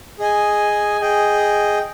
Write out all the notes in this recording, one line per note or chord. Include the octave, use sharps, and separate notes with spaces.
G#4 D#5 G#5
G#4 D#5 G5